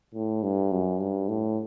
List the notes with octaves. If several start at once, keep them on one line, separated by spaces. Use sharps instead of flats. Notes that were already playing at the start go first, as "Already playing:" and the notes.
A2
G2
F#2
G2
A2